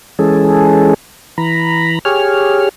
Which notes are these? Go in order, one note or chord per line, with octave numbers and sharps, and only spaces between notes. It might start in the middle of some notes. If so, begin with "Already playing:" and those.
E3 G#3 C#4 G#4 A4
E3 A#5 B5
G4 G#4 C#5 F6